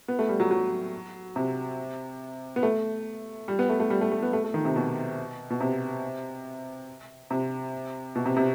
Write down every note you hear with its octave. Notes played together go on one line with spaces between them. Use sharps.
B3
A3
G3
F#3
F#3
C3
B3
A3
G3
B3
A3
A3
G3
A3
A3
B3
A3
A3
D#3
C3
B2
B2
C3
C3
B2
C3
C3